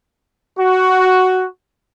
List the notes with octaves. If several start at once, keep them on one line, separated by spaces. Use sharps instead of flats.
F#4